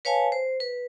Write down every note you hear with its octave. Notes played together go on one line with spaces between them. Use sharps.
B4 C#5 F5 G#5 A5
C5
B4